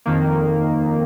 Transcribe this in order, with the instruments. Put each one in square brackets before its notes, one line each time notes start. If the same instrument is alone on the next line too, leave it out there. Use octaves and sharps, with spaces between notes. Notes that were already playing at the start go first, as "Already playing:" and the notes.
[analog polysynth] F2 D#3 A#3